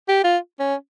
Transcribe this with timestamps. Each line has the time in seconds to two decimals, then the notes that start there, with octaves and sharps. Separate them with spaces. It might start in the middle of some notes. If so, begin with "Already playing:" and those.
0.09 G4
0.24 F4
0.59 C#4